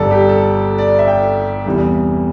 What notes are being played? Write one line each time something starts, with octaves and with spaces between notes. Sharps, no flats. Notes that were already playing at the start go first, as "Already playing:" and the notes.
Already playing: G1 G2 G3 A4 D5
G4
A4
D5
E5
G5
E2 C3 E3 G3